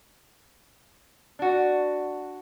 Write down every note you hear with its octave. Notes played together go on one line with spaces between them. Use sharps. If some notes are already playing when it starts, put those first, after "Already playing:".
D4 F#4